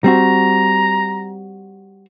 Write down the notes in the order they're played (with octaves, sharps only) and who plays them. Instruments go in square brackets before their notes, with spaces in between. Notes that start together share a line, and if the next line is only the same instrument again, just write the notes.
[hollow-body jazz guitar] G3 C4 F#4 [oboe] A#5